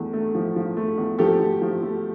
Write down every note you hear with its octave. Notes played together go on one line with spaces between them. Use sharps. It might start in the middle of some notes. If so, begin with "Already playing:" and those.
Already playing: E2 A3
A3
F3
F3
A3
E2
F3 G4 A4
A3
F3
A3